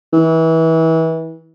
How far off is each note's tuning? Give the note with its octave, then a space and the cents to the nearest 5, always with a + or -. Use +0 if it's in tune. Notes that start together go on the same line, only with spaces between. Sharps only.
E3 -30